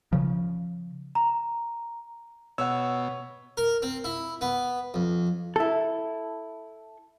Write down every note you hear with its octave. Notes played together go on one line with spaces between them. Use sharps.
C#3 F3
A#5
B2 C#5 F#5 E6
A#4
C4
E4
B3
F2
E4 A4